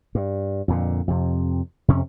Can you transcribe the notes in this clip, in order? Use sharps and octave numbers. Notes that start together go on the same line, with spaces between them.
G2
F2 A#2 D3
F2 C3
F2 C3 C#4